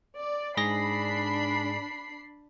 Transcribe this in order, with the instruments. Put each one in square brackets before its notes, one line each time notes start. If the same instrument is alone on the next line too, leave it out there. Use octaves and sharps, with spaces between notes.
[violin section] D5
[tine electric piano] G#2 G#4 A#6 [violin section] D4 B5 C7